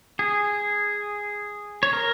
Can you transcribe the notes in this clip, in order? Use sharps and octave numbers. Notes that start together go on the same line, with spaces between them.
G#4
C#5
A#4